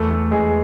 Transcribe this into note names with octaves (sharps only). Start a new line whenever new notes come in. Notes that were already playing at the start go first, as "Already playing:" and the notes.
Already playing: E2 A3 A4
A3 A4
E2 G#3 G#4